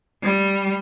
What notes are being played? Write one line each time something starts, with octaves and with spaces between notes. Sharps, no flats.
G3